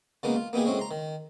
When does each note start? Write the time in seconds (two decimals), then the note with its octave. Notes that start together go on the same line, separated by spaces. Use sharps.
0.23 C#3 F#3 G#3 A#3 B3 D#4
0.36 F4
0.53 A#3 B3 D#4 G4 G#4
0.66 A2 F#3 G#3 C4 C#4 G#4
0.79 A#5 C6
0.91 D#3